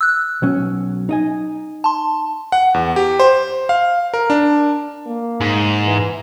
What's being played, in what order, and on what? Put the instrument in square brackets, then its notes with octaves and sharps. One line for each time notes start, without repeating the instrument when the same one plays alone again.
[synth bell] E6 F#6
[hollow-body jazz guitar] B1 F#3 C#4
D#4 D#5 G#5
[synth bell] A5 C6
[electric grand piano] F#5
E2
G4
C5
F5
A#4
D4
[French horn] A#3
[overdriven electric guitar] G#2
[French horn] E3